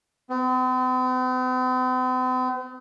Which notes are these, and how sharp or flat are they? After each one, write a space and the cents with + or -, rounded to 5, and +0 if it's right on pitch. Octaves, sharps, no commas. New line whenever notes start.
C4 -45